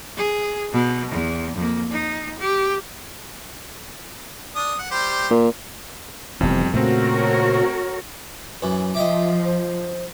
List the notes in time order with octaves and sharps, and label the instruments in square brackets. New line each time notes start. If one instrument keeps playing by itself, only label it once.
[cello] G#4
B2
E2
F2 A#3
D#4
G4
[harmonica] D4 D#6
F#5
G3 G4 C5
[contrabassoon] A#2
[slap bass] F1 E3 [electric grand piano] F2 G3 [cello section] B2
[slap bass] A#2 C#3 [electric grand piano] A3 C4 [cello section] F#4 A#4 C#5
[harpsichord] F#2 E3
[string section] F3 [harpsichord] D#5 G5 D6 [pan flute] E5
[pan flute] C5